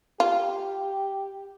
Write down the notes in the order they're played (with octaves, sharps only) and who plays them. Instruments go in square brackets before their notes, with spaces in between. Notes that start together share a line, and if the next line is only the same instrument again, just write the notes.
[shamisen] F4 [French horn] G4